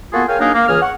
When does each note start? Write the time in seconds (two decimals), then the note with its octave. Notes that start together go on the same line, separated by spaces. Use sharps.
0.13 A#3 B3 F4 F#4 G#4 A4
0.28 G#4 A#4 C#5 F5 G5 G#5
0.39 F#3 A#3 D4 D#4 G#4 A#4
0.54 A#3
0.68 C#2 E3 A#3 G#4 F6
0.82 F#5 C#6